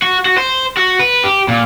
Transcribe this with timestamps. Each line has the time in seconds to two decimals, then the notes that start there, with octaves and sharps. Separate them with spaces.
0.02 F#4
0.26 F#4
0.38 C5
0.77 F#4
0.99 B4
1.24 G4
1.48 A#2